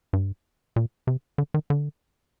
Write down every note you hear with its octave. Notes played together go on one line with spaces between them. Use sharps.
G2
A#2
C3
D3
D#3
D3